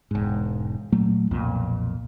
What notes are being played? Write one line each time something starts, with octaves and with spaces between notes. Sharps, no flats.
E1 G#2
A#2 F#3 A3 A#3
B1 F2 A#2